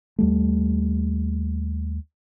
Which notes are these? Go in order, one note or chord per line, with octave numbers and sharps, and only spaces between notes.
D#2 G3 A3